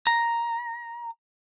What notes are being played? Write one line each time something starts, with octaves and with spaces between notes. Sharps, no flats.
A#5